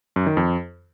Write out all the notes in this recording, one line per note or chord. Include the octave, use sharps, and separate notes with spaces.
F#2
D#3
F2